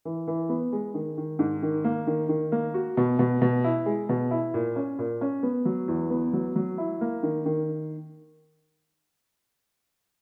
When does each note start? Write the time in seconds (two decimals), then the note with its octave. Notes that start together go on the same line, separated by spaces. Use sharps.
0.05 E3
0.27 E3
0.49 B3
0.72 G#3
0.94 D#3
1.17 D#3
1.39 G#2
1.62 D#3
1.84 A#3
2.07 D#3
2.29 D#3
2.52 A#3
2.74 F#4
2.97 B2
3.19 B2
3.41 B2
3.64 E4
3.86 G#3
4.09 B2
4.31 E4
4.54 A#2
4.76 C#4
4.99 A#2
5.21 C#4
5.43 B3
5.65 F#3
5.88 E2
6.10 B3
6.33 F#3
6.56 F#3
6.78 E4
7.01 A#3
7.23 D#3
7.45 D#3